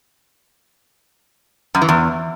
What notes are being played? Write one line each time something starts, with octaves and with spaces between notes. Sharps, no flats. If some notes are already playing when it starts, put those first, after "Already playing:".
F#2
E3
E2